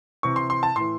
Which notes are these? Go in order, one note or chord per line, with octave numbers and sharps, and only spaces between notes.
C3 E3 C#6
C6
C6
A5
A2 E3 C6